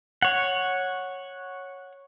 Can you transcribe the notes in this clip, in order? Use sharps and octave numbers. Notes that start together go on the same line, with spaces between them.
C#5 F#5